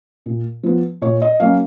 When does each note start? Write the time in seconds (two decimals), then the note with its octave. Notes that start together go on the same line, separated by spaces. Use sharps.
0.26 A#2
0.63 F3 B3
1.01 A#2 C#5
1.22 D#5
1.40 F#3 A#3 C#4 F5